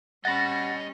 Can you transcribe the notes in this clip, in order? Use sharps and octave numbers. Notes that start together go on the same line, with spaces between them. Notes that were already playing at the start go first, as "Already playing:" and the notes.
G3 C#4 D#5 F#5 B5 A6 A#6